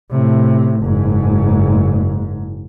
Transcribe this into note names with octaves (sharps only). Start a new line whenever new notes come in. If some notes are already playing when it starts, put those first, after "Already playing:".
A2 C3
F#1 G#2